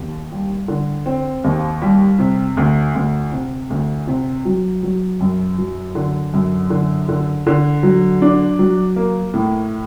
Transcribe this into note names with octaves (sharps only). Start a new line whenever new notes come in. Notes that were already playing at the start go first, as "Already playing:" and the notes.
Already playing: D#2
G3
D3
C4
D#2
G3
C3
D2
D2
C3
D2
C3
F#3
F#3
F#2
F#3
D3
F#2
D3
D3
D3
F#3
D4
F#3
A#3
A2